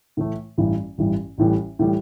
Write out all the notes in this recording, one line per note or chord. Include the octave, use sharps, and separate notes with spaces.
A2 E3 A3
A1 G2 E3 G3
A1 G2 E3 G3
A1 A2 E3 G3
A2 E3 G3